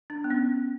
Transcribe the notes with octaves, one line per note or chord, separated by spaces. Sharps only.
D4
B3
C#4